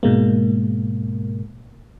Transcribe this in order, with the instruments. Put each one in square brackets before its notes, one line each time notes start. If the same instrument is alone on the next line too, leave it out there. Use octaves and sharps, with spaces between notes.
[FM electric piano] G#2 B2 G#3 A#3